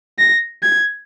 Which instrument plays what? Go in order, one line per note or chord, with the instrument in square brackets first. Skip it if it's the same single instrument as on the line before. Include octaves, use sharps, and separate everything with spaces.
[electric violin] A#6
G#6